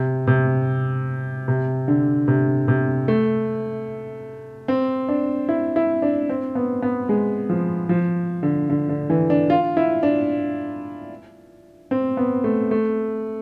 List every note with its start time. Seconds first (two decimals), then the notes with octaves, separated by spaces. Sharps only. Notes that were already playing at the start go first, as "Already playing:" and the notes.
Already playing: C3
0.27 C3
1.48 C3
1.88 D3
2.28 C3
2.68 C3
3.08 A3
4.68 C4
5.09 D4
5.49 E4
5.76 E4
6.02 D4
6.29 C4
6.55 B3
6.82 B3
7.09 G#3
7.50 F3
7.89 F3
8.43 D3
8.70 D3
8.89 D3
9.10 E3
9.30 D4
9.50 F4
9.77 E4
10.03 D4
11.91 C4
12.17 B3
12.44 A3
12.71 A3